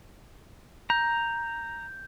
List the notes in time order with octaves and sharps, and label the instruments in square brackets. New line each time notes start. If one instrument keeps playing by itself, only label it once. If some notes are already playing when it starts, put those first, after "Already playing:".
[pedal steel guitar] A#5 [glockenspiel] G6